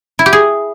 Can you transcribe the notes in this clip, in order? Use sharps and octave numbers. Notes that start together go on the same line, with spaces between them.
E4
G4
G#4